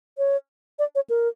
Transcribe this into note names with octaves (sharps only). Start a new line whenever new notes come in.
C#5
D5
C#5
A#4